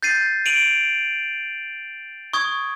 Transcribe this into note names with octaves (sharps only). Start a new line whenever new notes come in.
G6 A6 C7 D#7
D7 D#7 F7 F#7
C#6 D#6 G#6